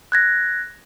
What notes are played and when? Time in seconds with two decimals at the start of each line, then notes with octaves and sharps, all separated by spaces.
0.12 F#6 G#6 A#6